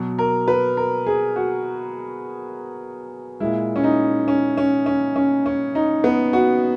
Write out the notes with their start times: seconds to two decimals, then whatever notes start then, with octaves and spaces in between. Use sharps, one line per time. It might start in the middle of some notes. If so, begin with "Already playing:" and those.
Already playing: B2 F#3
0.19 A#4
0.48 B4
0.77 A#4
1.06 G#4
1.36 F#4
3.40 A#2 G#3 E4
3.76 C#4
3.84 D#4
4.28 C#4
4.58 C#4
4.86 C#4
5.16 C#4
5.46 C#4
5.75 D#4
6.04 B3
6.33 F#4